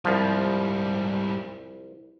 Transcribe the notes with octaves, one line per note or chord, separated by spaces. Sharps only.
C2 G#2 F3 G3